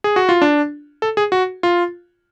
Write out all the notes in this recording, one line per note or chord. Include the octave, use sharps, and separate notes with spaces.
G#4
F#4
F4
D4
A4
G#4
F#4
F4